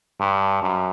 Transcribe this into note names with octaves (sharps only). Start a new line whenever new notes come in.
G2
F#2